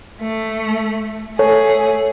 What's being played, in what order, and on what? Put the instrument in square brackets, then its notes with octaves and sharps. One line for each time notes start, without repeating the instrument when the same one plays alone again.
[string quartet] A3
[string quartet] A3 G#4 [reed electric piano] A4 C#5